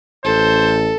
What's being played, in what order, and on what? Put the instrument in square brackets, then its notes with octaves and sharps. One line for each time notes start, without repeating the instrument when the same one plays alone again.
[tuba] A1 [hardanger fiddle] A4 [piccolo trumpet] C5